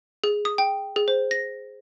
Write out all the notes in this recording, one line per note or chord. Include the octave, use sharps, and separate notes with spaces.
G#4
D#6
G5
G#4
C5
A#6